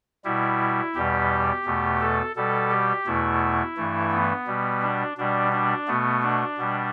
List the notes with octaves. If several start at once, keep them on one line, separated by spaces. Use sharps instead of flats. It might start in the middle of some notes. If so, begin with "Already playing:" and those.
B2 G3 E4
E2 B2 G3 G4
E2 B2 A3
A4
B2 G3 A4
G4
E2 B2 A3 E4
G2 E3 A3
B3
B2 G3
D4
B2 G3 D4
D4
B2 A3 B3
D4
B2 G3